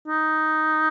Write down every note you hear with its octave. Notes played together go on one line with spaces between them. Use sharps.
D#4